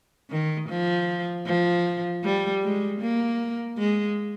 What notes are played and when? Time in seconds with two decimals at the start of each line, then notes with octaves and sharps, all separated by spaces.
0.30 D#3
0.69 F3
1.46 F3
2.23 G3
2.63 G#3
3.01 A#3
3.78 G#3